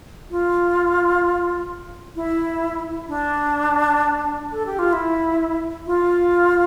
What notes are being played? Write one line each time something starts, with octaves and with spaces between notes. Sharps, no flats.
F4
E4
D4
A4
G4
F4
E4
F4